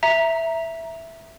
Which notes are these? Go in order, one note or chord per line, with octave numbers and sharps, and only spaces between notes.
E5 A#5